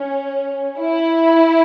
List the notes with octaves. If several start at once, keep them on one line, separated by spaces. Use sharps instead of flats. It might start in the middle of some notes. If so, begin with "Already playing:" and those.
Already playing: C#4
E4